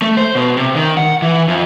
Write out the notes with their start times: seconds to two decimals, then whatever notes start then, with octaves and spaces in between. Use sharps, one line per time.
0.02 A3
0.17 C5
0.35 B2
0.57 C3
0.75 D#3
0.97 F#5
1.22 E3
1.48 F2